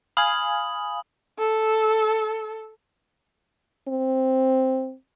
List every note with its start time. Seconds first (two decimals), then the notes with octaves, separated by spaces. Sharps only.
0.17 F5 G#5 B5 D#6 F#7
1.38 A4
3.88 C4